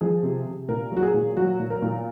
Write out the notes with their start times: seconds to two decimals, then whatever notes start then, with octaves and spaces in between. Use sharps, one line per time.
0.01 F3 G#4
0.23 C3
0.46 C3
0.68 A#2 A#4
0.92 F#3
0.97 F#4
1.03 G#4
1.14 A#2
1.37 F#3 F#4
1.59 A#2
1.70 A#4
1.82 A#2